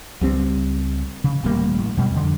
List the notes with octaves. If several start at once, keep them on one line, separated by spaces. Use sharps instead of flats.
C#2 G3 C4
C#3
D#1 A1 G3 A#3
A1
F#2 B2 G3
F2 D3